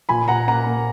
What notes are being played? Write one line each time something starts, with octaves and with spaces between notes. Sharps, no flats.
A#2 G#5 B5
A#2 F#5 A#5
A#3 F#5 A#5
A#3